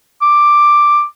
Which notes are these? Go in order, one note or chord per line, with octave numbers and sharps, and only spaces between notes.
D6